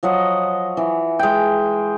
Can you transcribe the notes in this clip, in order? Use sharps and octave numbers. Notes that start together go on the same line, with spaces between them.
F3 F#3 D#5 F#5
E3
G#3 G5